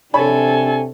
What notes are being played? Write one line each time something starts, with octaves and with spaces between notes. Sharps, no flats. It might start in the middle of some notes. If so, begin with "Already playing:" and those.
C3 D4 A4 C#5 G#5 B5